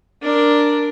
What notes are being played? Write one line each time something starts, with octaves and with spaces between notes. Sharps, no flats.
D4 A#4